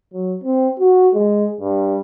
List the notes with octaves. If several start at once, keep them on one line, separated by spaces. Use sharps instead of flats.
F#3
C4
F#4
G#3
G2